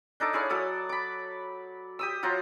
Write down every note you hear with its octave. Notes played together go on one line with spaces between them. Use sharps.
D4 D#4 A4 D6
E4 G#4 C#5 F5
F#3 A4 D5 D#6
B5 D6
G4 D#6 E6
F#3 F4 C5 A#5